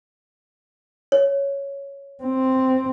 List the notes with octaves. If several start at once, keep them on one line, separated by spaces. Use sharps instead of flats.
C#5
C4